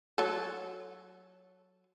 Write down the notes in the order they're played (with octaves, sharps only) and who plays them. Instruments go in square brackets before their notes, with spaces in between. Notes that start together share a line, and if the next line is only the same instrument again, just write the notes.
[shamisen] F#3 A4